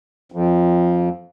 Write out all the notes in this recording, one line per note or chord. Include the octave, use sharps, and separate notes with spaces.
F2